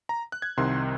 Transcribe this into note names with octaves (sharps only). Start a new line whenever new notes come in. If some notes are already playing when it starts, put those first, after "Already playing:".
A#5
F#6
G#6
C2 C3 D#3 C6